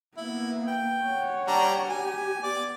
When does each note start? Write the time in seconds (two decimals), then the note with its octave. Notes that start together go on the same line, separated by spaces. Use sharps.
0.17 A#3 B3 E4
0.67 G5
1.05 C#5 F#5
1.47 G3 D4 A#5
1.89 G4 G#5
2.43 B3 D5